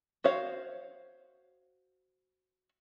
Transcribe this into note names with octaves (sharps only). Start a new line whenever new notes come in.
F#4 C5 C#5 F5